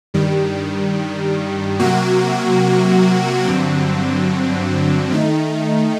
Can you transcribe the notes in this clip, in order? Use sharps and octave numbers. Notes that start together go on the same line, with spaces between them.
G2 D#3 G3
C3 F#3 A#3 F#4
G2 D3 F#3 C4
D#3 A3 D#4